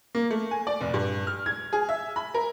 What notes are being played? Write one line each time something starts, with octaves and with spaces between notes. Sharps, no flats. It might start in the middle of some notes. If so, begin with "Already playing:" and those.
A#3
A3
G#5
D5
F1
G2
F6
G#6
G#4
E5
B5
A#4